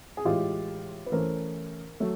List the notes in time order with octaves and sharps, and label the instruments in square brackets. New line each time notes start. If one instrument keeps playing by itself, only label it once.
[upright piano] G#4
A2 E3 G#3 F4 G4
B4
E3 A3 C#4 A#4 C5
F#3 A3